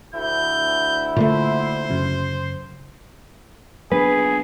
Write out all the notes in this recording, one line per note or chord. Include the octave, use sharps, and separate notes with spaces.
D2 E4 G6
A#2 D3 A3 C5
F#2 C#3 F#3
F#3 B3 D4 G#4 B4